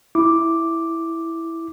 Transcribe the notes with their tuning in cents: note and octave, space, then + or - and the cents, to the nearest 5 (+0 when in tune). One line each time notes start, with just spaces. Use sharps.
E4 +0 D6 +0